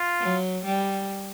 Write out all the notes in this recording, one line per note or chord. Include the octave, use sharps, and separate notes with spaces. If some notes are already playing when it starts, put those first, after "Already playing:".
Already playing: F4
F#3
G3